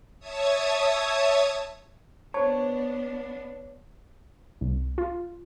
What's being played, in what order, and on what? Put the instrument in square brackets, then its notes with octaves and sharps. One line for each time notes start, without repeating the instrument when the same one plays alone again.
[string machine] C#5 E5 A5 D#6 G#6
[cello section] B3 D4 [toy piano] C5 A5 [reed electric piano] C#5
[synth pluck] C2
F4